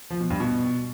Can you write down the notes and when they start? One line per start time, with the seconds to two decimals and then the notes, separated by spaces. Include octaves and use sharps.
0.10 F3
0.20 B2
0.30 G2
0.40 B2